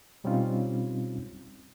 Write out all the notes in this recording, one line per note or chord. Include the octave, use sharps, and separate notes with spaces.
B2 G3 C4 C#4 D#4 F4